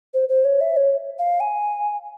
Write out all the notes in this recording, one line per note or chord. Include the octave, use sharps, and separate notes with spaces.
C5
C5
C#5
E5
C#5
F5
G#5